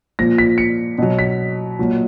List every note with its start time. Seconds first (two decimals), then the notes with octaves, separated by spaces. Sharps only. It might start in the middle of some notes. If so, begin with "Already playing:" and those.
0.19 A#2 F3 A#6
0.38 B6
0.58 C#7
0.98 B2 F#3
1.19 B6
1.79 A#2 F#3